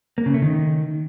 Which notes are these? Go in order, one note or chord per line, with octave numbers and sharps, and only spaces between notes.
A#3
C#3
A3
D#3